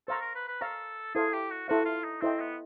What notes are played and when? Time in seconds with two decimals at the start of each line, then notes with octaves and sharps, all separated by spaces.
0.08 A4 C5 F5 A#5 C#6
0.22 A#4
0.35 B4
0.48 B4
0.61 A4 C5 F5 A#5 C#6
1.15 E4 G#4 A4 C5 F5
1.33 G4
1.51 F#4
1.68 E4 F#4 A4 C5 F5
1.86 F4
2.04 D#4
2.21 C4 E4 A4 C5 D#5 G5
2.40 B3